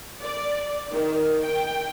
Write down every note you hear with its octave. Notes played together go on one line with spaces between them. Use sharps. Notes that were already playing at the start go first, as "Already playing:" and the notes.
D5
D#3
G5